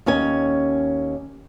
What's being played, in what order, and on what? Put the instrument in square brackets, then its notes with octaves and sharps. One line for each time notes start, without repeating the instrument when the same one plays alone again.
[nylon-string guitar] D#2 C#4 C#5 G#5